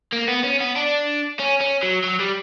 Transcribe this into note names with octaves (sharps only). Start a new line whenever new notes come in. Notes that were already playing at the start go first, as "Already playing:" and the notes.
A#3
B3
C#4
B3
D4
C#4
C#4
F#3
F#3
G3